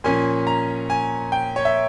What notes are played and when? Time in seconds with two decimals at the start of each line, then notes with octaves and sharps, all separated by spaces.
0.04 A#2 F3 A#3 C#4 G#5
0.47 A#5
0.90 G#5
1.32 G5
1.56 C#5
1.65 E5